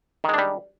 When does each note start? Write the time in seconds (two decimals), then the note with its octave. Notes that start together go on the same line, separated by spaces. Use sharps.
0.24 D#3
0.29 G#3
0.34 D4
0.38 G3